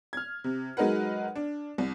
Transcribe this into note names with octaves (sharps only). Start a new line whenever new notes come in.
F6 G#6
C3
F#3 G#3 D#4 A#4 B4 F#5
D4
C2